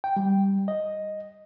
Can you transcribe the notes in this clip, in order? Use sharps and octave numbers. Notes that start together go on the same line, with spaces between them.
G5
G3
D#5